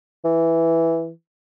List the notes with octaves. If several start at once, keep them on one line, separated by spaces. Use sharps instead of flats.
E3